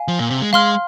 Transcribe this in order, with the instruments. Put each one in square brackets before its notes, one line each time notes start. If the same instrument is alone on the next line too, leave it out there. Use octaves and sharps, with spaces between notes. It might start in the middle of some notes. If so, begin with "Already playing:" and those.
Already playing: [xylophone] F5 G#5
[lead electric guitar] F3
A#2
C3
G#3
[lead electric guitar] G#3 [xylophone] F5 C6 F6